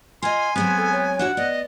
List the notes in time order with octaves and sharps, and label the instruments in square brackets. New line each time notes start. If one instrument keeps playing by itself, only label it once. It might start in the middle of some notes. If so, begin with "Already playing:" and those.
[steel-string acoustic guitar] F4 D#5 [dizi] G#5 [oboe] C6
[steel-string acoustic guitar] F#3 G#3 C4 [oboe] B3
[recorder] A4
C#5
[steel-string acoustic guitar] D4 E4 F#4 [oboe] F#5
[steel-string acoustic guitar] B3 [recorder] D5 [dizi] D#5